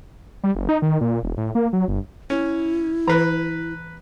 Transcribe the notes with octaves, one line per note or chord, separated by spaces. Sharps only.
G3
F#1
D#4
D#3
A#2
E1
A2
A#3
F#3
G1
C#4 E4
E3 B4 A#5